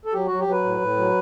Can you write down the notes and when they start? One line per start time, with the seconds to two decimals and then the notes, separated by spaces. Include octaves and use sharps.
0.05 A4
0.13 F#3 G4
0.26 F#3 F#4
0.39 G4
0.47 F#3 B4
0.64 A2
0.81 A2
0.97 F#3